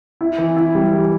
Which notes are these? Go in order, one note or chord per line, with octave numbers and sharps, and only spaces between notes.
E4
E3
E4
G3
E3